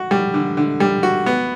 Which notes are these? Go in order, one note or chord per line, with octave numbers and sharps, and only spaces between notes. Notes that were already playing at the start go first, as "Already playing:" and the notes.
Already playing: F#4
G3
D3
D3
G3
F#4
B3